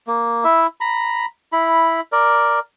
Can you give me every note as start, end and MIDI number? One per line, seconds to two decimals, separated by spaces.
0.07 0.44 58
0.44 0.67 64
0.44 0.67 76
0.81 1.26 82
0.81 1.26 83
1.53 2.00 64
1.53 2.00 83
2.12 2.59 70
2.12 2.59 74